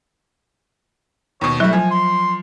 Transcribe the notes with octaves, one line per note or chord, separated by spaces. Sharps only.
D#2 B2 C#5
F#3 G3 A3 E4 F#4
F3 G#5
C6